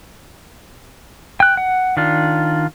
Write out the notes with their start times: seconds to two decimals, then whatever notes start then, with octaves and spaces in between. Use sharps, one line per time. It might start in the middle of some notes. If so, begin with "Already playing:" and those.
1.40 G5 F#6
1.57 F#5
1.97 D#3 D4 F4